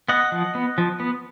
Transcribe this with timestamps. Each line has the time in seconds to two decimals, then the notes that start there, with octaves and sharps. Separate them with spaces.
0.08 B3 D#5 F#5
0.32 F3
0.55 B3
0.78 F3
1.00 B3